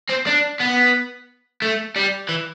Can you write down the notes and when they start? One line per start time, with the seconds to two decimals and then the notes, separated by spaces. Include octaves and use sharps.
0.10 C4
0.27 D4
0.60 B3
1.62 A3
1.96 G3
2.29 E3